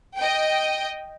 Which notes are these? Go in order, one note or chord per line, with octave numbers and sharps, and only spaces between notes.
D#5 G5